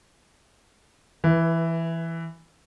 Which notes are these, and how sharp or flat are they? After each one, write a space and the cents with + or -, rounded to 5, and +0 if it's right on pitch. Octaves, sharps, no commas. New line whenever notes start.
E3 +5 B4 -20